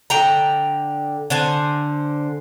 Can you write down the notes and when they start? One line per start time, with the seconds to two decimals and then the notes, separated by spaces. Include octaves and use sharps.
0.10 D3 G5 A#5
1.30 D3 C5 G#5